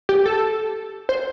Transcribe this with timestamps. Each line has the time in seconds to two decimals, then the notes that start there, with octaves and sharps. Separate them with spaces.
0.09 G4
0.26 A4
1.09 C5